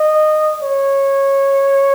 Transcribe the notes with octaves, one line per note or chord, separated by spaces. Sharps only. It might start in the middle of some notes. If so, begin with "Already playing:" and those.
Already playing: D#5
C#5